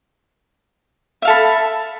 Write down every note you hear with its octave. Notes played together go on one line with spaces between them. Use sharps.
A4 E5 F5 B5